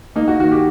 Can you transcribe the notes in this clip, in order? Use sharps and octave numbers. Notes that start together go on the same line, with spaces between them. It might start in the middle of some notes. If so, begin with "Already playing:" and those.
A#3 D#4
F#4
D#3 F#4
G4